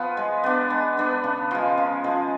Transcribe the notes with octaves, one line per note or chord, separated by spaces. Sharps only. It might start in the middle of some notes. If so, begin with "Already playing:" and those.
Already playing: F3 B3
G#3
B3 D4
G#3
B3 D4
C#3
F3 G#3
C#3
F3 G#3